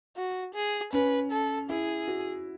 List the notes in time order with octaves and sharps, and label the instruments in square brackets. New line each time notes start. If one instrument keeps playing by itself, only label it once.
[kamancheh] F#4
G#4
[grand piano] C#4 [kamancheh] B4
[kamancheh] A4
[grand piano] E4 [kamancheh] G#4
[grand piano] F#4